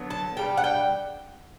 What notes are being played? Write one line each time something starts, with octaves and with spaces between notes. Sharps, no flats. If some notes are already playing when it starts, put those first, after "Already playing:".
Already playing: D3 F#3 B3
A5
C#3 G3 D4 G5
F#5
G5